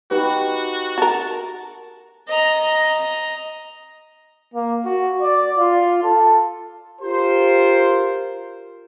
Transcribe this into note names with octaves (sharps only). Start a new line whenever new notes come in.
D#4 F#4 G4 B4
F#4 A#4 A5
D#5 A#5
A#3
F#4
D5
F4
A4
F4 G4 A#4 C5